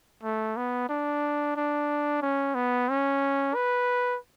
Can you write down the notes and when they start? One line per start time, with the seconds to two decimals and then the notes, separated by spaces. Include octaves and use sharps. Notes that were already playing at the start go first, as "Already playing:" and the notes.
0.23 A3
0.57 B3
0.89 D4
1.56 D4
2.22 C#4
2.55 B3
2.89 C#4
3.55 B4